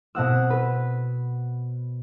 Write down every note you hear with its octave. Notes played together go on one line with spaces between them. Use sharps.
B2 C4 F#5 E6
B4